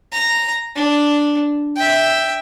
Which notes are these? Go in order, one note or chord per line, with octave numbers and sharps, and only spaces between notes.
A#5
D4
E5 G5